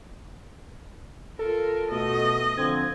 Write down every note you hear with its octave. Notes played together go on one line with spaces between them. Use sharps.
F4 A4 A#4
B2 A3 D#5
D3 F3 C4 G#6